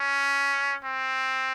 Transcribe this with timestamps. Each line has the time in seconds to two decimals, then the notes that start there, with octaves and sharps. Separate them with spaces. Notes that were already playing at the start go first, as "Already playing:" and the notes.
Already playing: C#4
0.84 C4